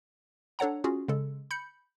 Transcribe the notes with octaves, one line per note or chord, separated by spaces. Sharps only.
D4 A4 C#5 F#5 A#5
C#4 F4 F#4 G#4
C#3 G#3 A4
B5 G6 C#7